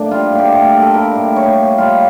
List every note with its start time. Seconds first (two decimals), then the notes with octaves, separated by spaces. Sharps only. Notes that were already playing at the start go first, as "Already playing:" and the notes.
Already playing: A2 A#3 D4
0.11 G3 F4
0.32 A2
0.39 G4
0.53 A2
0.74 A#3
0.82 A4
0.94 G3 A#4
1.16 A2
1.36 A2 C#5
1.57 A#3
1.78 G3 F4